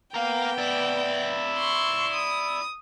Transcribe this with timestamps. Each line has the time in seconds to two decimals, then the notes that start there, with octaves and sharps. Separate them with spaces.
0.14 B3 A#4 F5 G5
0.58 E4 D5
1.58 C6 C#6
2.13 D#6